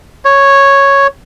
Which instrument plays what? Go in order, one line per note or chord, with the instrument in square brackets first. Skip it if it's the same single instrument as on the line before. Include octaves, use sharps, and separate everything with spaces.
[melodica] C#5